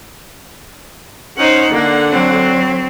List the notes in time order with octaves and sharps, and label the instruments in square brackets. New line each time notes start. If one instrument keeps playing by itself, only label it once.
[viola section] C#4 D#4 [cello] C5 F#5
[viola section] D3 F#5 [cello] A#3
[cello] F#3 C4